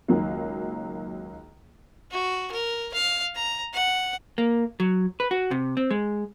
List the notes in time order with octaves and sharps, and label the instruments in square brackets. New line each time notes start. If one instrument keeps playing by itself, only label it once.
[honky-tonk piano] C#2 D#3 F#3 A#3
[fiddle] F#4
A#4
F5
A#5
F#5
[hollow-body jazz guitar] A#3
F#3
B4
F#4
C3
C4
G#3